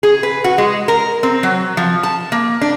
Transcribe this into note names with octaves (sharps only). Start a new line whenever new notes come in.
G#4
B4
F#4
G#3
A#4
C4
F#3
F3
A5
A#3
D4